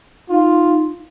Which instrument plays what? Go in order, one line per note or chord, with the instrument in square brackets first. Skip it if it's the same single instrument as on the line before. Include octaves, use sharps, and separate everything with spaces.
[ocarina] D#4 [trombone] F4